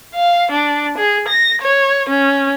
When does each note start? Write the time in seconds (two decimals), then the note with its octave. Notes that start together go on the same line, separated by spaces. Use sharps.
0.15 F5
0.51 D4
0.98 G#4
1.28 A#6
1.62 C#5
2.10 C#4